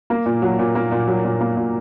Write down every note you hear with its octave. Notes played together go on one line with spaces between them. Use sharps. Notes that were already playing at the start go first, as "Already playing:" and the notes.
A#3
A#2
F#3
A#2
A#3
A#2
F#3
A#2
A#3
A#2